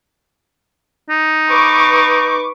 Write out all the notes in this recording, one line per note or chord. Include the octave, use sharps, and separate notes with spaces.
D#4
B4 C#6 D6